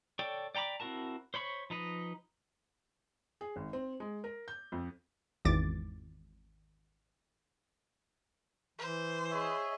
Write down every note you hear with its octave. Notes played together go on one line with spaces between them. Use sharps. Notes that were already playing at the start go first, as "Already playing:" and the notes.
A4 C#5 D5 G5
D5 G5 A#5 B5 D6
C4 E4 F#4 A#4 A5
C5 C#5 B5 C#6
F3 D#4 B4 D#5
G#4
G#1
C4
G#3
A#4
G6
F2
G#1 E2 D6 A6
E3 C5
G#4 C#5 D#5 E5